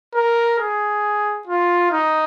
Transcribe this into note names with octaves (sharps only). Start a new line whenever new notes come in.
A#4
G#4
F4
D#4